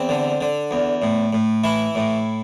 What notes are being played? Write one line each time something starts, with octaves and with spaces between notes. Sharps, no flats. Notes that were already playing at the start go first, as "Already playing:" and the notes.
Already playing: E2 C4
D3
D3
E2
A2
A2
E3 E4
A2